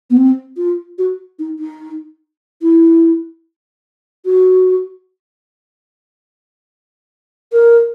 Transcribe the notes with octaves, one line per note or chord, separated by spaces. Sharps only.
B3
C4
F4
F#4
D#4
D#4
E4
F#4
A#4